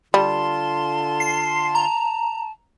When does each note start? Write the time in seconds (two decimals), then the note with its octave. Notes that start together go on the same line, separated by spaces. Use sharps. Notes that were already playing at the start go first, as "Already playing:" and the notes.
0.14 D3 G3 F4 A5 C6
1.20 C7
1.75 A#5